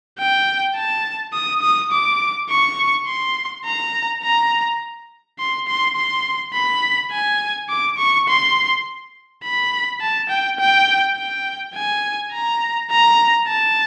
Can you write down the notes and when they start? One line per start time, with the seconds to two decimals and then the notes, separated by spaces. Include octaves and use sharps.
0.19 G5
0.75 A5
1.33 D#6
1.62 D#6
1.92 D6
2.50 C#6
3.07 C6
3.65 A#5
4.23 A#5
5.39 C6
5.68 C6
5.96 C6
6.54 B5
7.11 G#5
7.69 D6
7.98 C#6
8.28 C6
9.44 B5
10.00 A5
10.29 G5
10.59 G5
11.16 G5
11.74 G#5
12.32 A#5
12.91 A#5
13.48 A5